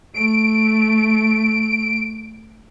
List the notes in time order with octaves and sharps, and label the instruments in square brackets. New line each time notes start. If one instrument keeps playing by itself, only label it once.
[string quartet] A3 [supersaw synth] D7